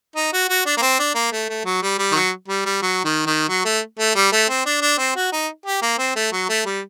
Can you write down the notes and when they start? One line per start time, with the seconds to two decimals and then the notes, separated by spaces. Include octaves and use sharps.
0.16 D#4
0.33 F#4
0.49 F#4
0.66 D4
0.77 A#3
0.82 C4
0.99 D4
1.15 A#3
1.32 A3
1.49 A3
1.65 F#3
1.82 G3
1.99 G3
2.12 D#3
2.15 F#3
2.48 G3
2.66 G3
2.82 F#3
3.05 D#3
3.26 D#3
3.49 F#3
3.65 A3
3.99 A3
4.15 G3
4.32 A3
4.49 C4
4.66 D4
4.81 D4
4.98 C4
5.16 F#4
5.32 D#4
5.66 G4
5.82 A#3
5.99 C4
6.16 A3
6.32 F#3
6.49 A3
6.66 G3